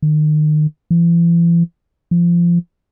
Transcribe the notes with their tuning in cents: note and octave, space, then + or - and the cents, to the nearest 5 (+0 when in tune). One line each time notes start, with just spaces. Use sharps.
D#3 -35
E3 +45
F3 -20